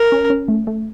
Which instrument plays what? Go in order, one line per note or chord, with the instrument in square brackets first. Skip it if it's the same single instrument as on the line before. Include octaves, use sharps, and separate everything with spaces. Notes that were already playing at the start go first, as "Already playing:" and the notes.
Already playing: [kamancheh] A#4
[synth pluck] C#4
C#4
A3
A3